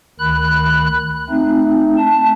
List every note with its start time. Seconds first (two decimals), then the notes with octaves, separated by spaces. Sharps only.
0.19 D2 D#3 B5 F#6
1.30 A3 C4 D#4
1.97 A5